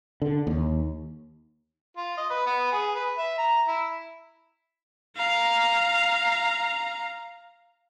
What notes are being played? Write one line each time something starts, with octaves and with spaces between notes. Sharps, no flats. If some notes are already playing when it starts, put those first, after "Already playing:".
D3
D#2
F4
D#5
B4
B3
G#4
B4
E5
A#5
E4
F5 A#5